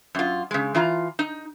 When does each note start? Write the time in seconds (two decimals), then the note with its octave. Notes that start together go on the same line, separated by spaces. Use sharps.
0.15 F#2 F4
0.51 C#3 G#3
0.74 E3 F4 A#5
1.19 D#4